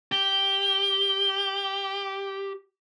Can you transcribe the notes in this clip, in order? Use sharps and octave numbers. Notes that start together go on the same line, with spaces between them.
G4 G7